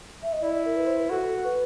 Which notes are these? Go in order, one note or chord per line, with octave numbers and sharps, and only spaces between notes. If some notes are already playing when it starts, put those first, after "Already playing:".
E5
D#5
E4 D5
D5
A#4
B4
C5
B4
F#4 A4
B4